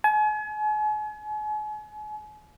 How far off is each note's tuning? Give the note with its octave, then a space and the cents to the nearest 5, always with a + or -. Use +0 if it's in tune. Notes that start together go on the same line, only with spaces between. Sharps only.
G#5 +40